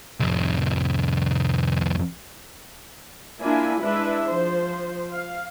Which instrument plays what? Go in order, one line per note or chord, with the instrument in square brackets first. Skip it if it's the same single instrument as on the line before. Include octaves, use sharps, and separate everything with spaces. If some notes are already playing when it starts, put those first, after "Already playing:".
[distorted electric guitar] C2 F2
[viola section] A#3 D4 E4 F4 G#5 B5
G#3 D4 E4 B4 E5
F3 C5
F5